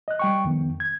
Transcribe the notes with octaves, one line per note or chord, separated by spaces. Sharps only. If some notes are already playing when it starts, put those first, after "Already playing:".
D#5 F#6
G3 G5 C#6
F2 D#3 B3
G#6